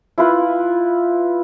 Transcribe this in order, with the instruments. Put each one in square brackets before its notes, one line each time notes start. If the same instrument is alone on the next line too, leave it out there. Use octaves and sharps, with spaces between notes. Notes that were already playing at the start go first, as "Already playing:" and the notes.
[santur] E4 F4 B4